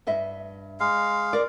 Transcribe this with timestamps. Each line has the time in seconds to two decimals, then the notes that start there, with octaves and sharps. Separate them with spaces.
0.07 G2 D#5 E5
0.80 G#3 F5
1.33 A#4 D5